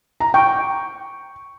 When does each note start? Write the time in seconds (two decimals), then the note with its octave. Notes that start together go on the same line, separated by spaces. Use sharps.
0.20 A#5
0.34 G5 C#6